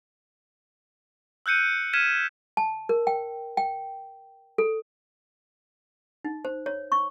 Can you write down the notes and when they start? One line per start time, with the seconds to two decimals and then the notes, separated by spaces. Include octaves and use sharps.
1.46 E6 F#6 G6 C#7 D#7
1.93 F6 G#6 B6 D#7 E7
2.57 A5
2.89 A#4
3.07 G5
3.57 G5
4.58 A4
6.25 D#4
6.45 C5
6.66 C#5
6.92 C#6